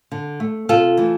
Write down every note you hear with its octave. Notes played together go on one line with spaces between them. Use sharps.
D3
A3
C3 F4 A4
E3 A3